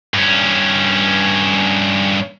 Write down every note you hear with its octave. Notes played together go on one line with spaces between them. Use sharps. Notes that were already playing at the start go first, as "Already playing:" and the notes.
G2 C#4